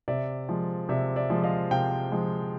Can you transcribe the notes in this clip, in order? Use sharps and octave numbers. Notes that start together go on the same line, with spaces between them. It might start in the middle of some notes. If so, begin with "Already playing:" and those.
C3 D5 E5
F3 G#3
C3 D5 E5
D5 E5
F3 G#3
D#5 F5
C3 F5 G5
F3 G#3